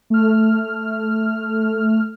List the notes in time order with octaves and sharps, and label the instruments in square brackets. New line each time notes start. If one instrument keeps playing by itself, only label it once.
[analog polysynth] A3 F6